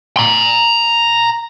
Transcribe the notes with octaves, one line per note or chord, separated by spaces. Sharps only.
A#5 C6